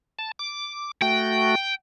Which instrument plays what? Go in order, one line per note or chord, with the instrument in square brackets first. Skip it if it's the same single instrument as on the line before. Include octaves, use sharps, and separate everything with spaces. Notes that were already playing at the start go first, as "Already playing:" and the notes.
[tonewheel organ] A5
D6
[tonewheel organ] A3 F#4 [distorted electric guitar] G5